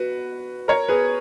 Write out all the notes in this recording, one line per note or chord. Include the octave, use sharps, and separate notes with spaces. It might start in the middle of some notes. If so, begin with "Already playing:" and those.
Already playing: F#4 B4
A#4 C#5
G#4 B4